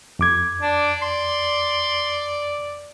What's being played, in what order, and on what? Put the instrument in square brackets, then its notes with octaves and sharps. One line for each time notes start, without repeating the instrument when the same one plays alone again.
[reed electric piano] F2 D6 G#6
[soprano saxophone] D4 [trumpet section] D5
[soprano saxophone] C6